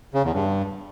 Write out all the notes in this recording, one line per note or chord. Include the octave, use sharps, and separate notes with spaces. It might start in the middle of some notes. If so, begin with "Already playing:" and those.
C#3
E2
G2